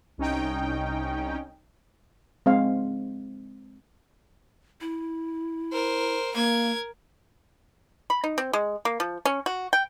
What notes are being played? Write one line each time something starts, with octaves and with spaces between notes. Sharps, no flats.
C2 C#4 D#4 G5
G#3 C4 F5
E4
A#4 C5
A#3 A#4 G#6
B5
D#4
C4
G#3
A#3
F3
C#4
F#4
G5